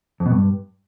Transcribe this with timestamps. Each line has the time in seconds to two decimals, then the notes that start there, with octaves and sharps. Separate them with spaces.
0.20 F2
0.26 B2
0.31 G2